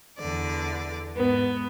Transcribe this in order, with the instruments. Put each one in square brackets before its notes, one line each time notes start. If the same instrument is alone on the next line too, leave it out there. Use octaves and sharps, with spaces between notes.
[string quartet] E2 D3 D5
[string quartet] G#2 [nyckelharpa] B3